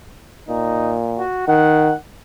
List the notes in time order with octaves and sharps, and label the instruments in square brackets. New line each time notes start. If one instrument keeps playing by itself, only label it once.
[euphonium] A#2 [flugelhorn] D#4
[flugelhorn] F#4
[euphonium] D#3 [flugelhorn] F#5